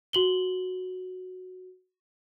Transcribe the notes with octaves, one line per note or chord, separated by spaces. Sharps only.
F#4 F#7 G7